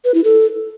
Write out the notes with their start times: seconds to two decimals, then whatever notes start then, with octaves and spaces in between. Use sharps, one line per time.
0.05 B4
0.14 E4
0.24 A4